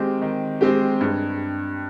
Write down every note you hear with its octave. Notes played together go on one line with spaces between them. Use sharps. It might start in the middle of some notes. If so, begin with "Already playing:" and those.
Already playing: D#3 G#3 C4 G4
D#3
G#3 C4 G4
G2